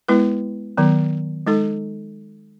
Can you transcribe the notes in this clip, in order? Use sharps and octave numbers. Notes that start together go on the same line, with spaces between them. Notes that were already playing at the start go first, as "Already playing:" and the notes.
G#3 B3 E4 B4
D#3 F#3 B3
G#3 D#4 A4